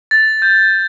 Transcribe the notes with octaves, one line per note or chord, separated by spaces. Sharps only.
A6
G6